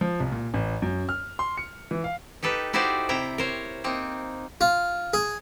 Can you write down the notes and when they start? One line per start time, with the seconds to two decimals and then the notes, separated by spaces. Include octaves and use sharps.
0.01 F3
0.20 C2
0.32 A#2
0.54 A1
0.82 F#2
1.09 F6
1.39 C6
1.57 C#7
1.91 E3
2.04 F5
2.43 D#4 G4 A4 B4
2.73 D#4 E4 F#4 G4 C5 D5
3.09 C3 E4 G5 A#5
3.38 A#4 C5 C#5
3.84 A#3 C4 D#4
4.61 F4
5.13 G#4